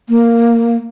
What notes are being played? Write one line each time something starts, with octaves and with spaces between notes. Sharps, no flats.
A#3